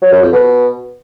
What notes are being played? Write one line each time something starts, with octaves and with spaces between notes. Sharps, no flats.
F#3
F#2
F2
B2